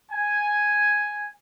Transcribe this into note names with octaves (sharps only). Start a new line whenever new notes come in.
G#5